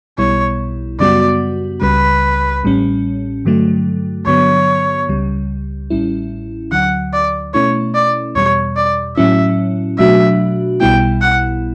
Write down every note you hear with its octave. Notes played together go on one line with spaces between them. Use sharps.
B1 B2 G3 B3 E4 C#5
F#2 C#3 G3 B3 F#4 D5
C#2 C#3 G3 B4
A1 A2 G3 C#4
G2 D3 F#3 A3
G2 D3 F#3 B3 C#5
C#2 C#3 G3
A1 A2 G3 C#4 E4
D2 D3 F#3 F#5
D5
B2 A3 C#4 E4 C#5
D5
E2 B2 G3 C#5
D5
A2 F#3 C#4 E4 E5
B2 F#3 A3 D4 F#4 E5
B1 B2 G3 B3 E4 G5
F#5